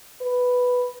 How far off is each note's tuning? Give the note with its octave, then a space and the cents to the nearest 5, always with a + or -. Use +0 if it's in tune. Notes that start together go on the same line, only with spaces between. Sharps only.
B4 +0